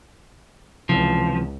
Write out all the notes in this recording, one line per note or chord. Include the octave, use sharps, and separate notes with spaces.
C#2 C3 E3 F3